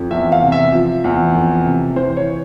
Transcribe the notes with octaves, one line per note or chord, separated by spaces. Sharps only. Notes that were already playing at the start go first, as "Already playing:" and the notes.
Already playing: F2
E2 E5
F5
C3
E5
F3
E2
F2
C3
E3 C5
C#5